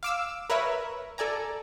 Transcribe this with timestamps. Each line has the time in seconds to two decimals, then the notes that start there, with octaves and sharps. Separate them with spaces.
0.03 F5 D6 E6
0.50 A#4 B4 C#5 E5
1.18 A4 D5 G#5 A#5